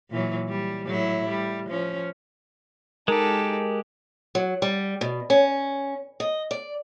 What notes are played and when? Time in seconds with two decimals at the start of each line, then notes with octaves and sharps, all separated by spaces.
0.11 A#2 E3 F#3
0.49 G3
0.86 A2 F#3 E4
1.29 G3
1.69 F3 C#4
3.08 G#3 D#4 G4 A4 A#4
4.35 F#3
4.62 G3
5.01 B2
5.30 C#4
6.20 D#5
6.51 D5